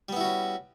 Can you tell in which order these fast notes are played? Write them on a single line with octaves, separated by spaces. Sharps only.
G3 B3 E4 F#4 C#4